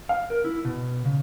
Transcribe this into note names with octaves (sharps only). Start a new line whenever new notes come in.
F5
A#4
E4
B2
C#3